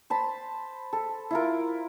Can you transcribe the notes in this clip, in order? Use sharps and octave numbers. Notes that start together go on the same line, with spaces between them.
C5 A5 B5
A4
E4 F4 A#4